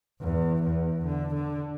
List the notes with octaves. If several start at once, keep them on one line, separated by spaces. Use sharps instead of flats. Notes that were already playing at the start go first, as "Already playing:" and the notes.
E2
E2
D3
D3